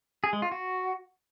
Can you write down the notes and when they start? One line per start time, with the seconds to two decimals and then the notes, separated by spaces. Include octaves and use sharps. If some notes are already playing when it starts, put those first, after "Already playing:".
0.24 G#4
0.33 G#3
0.42 F4
0.52 F#4